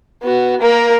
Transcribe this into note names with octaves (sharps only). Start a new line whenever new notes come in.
B3 F#4
A#3 A#4